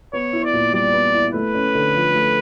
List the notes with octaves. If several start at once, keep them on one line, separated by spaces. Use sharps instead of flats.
B3 C#5
E4
D5
A#2
G3 D5
B3
E4
A3 B4
C#4
D3
F3
A3